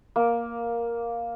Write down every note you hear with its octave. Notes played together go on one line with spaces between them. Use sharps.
A#3